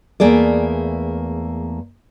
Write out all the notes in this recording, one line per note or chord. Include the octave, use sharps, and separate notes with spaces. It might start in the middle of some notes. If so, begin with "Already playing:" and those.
E2 A3 A#3 G#4 D5